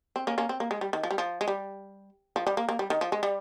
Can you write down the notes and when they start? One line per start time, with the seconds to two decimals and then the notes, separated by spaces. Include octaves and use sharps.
0.16 C4
0.27 A#3 C#4
0.38 A#3 C#4
0.49 C4
0.60 A#3
0.71 G#3
0.81 G3
0.93 D#3
1.03 F3
1.11 G3
1.18 F3
1.41 G#3
1.48 G3
2.36 F3
2.47 G3
2.57 A#3
2.69 A#3
2.79 G3
2.90 D#3
3.01 F3
3.12 G#3
3.23 G3